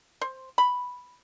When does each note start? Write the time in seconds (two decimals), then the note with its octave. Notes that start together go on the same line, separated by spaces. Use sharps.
0.21 C5
0.58 B5